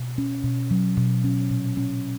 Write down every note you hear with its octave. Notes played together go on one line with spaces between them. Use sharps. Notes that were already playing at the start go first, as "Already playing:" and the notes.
Already playing: B2
C#4
B2
F#3
B2
C#4
A#2
C#4